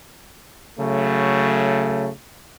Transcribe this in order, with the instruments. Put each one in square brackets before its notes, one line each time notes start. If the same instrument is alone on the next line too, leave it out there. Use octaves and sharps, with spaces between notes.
[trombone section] C#3 F#3 A3